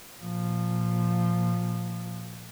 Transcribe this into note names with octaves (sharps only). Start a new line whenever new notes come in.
A#2 F3